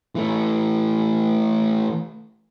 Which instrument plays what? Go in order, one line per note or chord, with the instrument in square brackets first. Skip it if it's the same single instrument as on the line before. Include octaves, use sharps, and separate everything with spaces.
[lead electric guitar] E3 A3